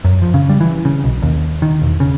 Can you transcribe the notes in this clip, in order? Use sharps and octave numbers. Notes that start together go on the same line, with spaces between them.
F#2
F3
C#3
G3
E3
C#3
B1
D#2
D#3
E1
C#3